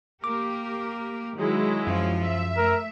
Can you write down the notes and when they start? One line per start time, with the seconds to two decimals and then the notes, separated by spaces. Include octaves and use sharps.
0.24 A#3 G4 A#4 D6
1.37 D#3 F#3 G#3 E4
1.87 F#2 F3 F4
2.24 E5
2.57 A3 A#4